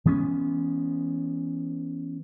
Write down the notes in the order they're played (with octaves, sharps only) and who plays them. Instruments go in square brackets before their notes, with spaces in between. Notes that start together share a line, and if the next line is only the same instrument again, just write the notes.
[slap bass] E3 G#3 B3 C#4